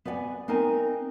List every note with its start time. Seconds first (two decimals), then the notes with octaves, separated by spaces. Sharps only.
0.05 B3 B4 D5 F#5 G#5
0.48 B3 C4 D#4 A#4 G#5